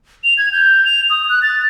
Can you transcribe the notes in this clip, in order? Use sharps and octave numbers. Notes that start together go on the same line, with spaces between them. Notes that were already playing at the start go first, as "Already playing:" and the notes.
F7
G#6
G6
F7
D#6
F#6
A6